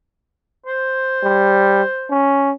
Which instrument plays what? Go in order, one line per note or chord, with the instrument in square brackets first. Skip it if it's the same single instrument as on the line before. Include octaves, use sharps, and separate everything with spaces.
[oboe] C5
[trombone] G3
C#4